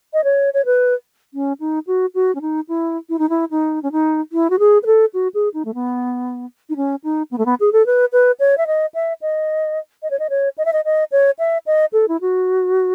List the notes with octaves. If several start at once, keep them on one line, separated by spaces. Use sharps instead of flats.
D#5
C#5
C#5
B4
C#4
D#4
F#4
F#4
C#4
D#4
E4
E4
D#4
E4
D#4
C#4
D#4
E4
F#4
G#4
B4
A4
F#4
G#4
D#4
A3
B3
D#4
C#4
D#4
B3
A3
B3
G#4
A4
B4
B4
C#5
E5
D#5
E5
D#5
D#5
C#5
D#5
C#5
D#5
E5
D#5
D#5
C#5
E5
D#5
A4
E4
F#4